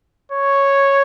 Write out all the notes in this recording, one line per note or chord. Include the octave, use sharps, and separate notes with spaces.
C#5